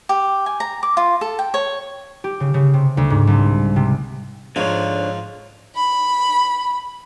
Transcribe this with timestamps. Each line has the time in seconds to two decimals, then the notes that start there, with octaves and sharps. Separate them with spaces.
0.09 G4
0.46 G#5
0.60 A#5
0.83 D6
0.97 F4
1.21 A4
1.39 G5
1.54 C#5
2.24 G4
2.40 C#3
2.54 C#3
2.74 C3
2.97 D2
3.10 G#2
3.27 C2
3.76 C3
4.56 G#2 D3 F3 C#5
5.76 B5